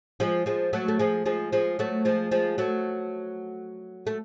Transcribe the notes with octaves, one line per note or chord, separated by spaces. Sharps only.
F3 G#3
F3 G#3
F#3 A3
A3
F3 G#3
F3 G#3
F3 G#3
F#3 A3
F3 G#3
F3 G#3
F#3 A3
A3